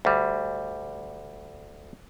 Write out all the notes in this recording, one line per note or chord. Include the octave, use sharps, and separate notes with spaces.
D2 G3